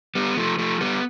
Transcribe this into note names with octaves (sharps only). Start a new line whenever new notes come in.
G3 B3
F3 A3
F3 A3
G3 B3